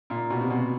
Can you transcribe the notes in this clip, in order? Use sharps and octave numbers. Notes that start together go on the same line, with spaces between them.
A#2
B2
C3
B2